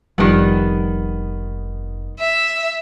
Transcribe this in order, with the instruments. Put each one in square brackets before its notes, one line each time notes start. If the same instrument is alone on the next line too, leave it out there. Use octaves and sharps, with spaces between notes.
[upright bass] F1 [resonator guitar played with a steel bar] D#3 B3 [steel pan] F3 G3
[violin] E5